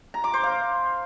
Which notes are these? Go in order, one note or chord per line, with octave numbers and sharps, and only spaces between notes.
A#5
D6
C5
F5